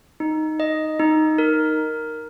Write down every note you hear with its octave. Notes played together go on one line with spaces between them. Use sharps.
D#4
D#5
D#4
A#4